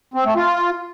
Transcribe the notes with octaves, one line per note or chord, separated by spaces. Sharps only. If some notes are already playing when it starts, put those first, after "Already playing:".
C4
A3
F4